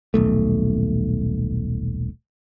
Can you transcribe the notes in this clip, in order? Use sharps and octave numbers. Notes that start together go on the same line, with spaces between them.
D#1 B1 A3